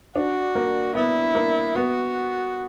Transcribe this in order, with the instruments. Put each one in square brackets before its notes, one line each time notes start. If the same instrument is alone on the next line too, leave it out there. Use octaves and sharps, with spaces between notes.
[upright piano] D4 [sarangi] F#4
[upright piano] A#3
[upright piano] B3 [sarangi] E4
[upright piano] A#3
[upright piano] B3 [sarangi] F#4